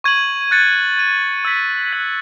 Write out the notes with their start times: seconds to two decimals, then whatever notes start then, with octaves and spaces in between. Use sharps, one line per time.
0.04 C#6 G#6 D#7 F#7
0.51 F#6 A6 C#7
0.98 G#6 D#7 F#7
1.45 E6 G#6 B6
1.92 F#6 B6 D#7 F#7